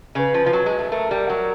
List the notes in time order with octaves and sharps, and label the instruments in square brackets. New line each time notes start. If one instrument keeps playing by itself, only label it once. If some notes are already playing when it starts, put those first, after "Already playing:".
[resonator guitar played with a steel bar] C#3 [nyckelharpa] B4
[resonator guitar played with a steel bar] F3
F3
F#3
G#3
A3
[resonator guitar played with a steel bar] A3 [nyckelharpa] A#4
[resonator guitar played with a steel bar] G3
F#3